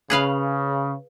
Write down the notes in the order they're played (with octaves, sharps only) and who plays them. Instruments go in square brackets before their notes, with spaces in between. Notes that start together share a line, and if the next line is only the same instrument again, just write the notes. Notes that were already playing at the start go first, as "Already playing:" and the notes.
[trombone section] C#3 [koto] G#4 B4 F5